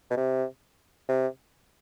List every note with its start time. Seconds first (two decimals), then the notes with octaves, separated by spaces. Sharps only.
0.10 B2
0.17 C3
1.09 C3